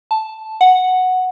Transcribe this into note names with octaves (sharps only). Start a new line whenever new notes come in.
A5
F#5